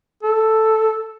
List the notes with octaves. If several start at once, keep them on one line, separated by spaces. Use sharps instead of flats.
A4